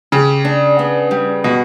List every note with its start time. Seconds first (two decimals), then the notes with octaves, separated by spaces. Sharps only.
0.12 C#3 G4
0.45 D4
0.79 B3
1.11 G3
1.44 B2 F#4